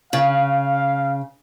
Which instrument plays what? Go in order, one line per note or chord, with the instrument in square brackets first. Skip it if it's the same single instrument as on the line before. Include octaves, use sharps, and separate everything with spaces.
[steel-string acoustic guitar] C#3 [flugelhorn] F5